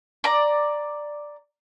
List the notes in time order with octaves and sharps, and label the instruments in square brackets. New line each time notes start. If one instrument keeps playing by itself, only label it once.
[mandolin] D5 A#5